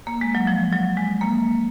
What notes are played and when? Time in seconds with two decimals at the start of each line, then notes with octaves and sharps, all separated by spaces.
0.07 A#3
0.21 G#3
0.35 F#3
0.47 F3
0.73 F#3
0.97 G#3
1.21 A#3